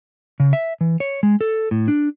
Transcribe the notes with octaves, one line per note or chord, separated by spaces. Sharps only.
C#3
E5
E3
C#5
G#3
A4
A2
D4